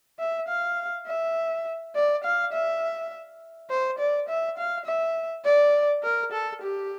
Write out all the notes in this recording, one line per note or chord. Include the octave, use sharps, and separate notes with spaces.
E5
F5
E5
D5
F5
E5
C5
D5
E5
F5
E5
D5
A#4
A4
G4